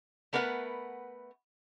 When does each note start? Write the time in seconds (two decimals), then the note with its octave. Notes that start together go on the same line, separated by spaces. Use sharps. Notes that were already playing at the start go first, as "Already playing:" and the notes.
0.33 A3 B3 A#4 B4 E5 F#5